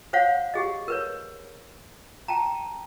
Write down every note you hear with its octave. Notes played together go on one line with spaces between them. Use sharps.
C5 C#5 F5 F#5
G4 G#4 D#5
A#4 B4 C#5
G5 A5 A#5